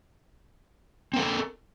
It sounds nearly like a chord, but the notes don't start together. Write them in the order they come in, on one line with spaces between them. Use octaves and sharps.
C4 A#4 A4